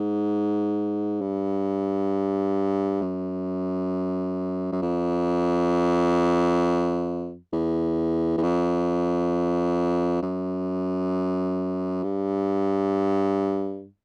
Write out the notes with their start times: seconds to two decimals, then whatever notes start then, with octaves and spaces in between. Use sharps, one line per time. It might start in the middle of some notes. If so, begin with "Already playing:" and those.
Already playing: G#2
1.21 G2
3.02 F#2
4.72 F#2
4.82 F2
7.53 E2
8.37 E2
8.43 F2
10.22 F#2
12.03 G2